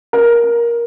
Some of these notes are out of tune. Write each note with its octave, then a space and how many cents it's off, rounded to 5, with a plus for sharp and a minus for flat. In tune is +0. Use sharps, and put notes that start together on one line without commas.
A#4 +15